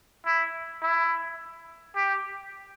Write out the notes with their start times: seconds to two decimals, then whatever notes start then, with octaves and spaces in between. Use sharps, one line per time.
0.26 E4
0.82 E4
1.96 G4